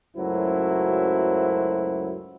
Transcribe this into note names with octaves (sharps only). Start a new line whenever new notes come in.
C#2 F#2 F#3 A3 E4 C5